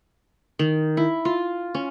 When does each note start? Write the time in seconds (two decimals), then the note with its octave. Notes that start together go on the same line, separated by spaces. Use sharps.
0.59 D#3
0.97 E4
1.25 F4
1.74 C#4